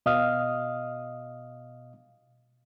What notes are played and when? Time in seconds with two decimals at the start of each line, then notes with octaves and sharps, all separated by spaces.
0.06 B2 D#5 F5 D#6 F6